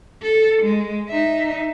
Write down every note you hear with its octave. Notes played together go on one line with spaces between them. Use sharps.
A4
G#3
D#4 E5